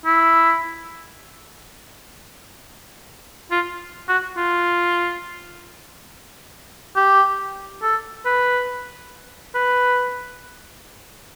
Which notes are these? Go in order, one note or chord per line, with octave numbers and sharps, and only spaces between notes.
E4
F4
F#4
F4
G4
A4
B4
B4